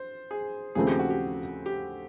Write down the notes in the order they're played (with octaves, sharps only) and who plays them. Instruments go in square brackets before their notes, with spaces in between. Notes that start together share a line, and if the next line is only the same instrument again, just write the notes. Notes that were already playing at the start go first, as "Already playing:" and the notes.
Already playing: [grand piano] C5
G#4
[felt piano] D#2 C#3 F3 A3 C4 [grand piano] G#4
[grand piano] G4
F#4
G4
G4